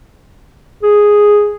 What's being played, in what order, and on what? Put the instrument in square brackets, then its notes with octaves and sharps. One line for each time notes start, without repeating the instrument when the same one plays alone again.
[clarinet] G#4